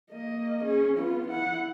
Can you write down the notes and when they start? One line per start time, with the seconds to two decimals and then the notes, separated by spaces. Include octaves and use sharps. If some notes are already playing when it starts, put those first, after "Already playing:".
0.12 A#3 D#5
0.63 C#4 G#4
0.97 B3 F4
1.27 E4 F#5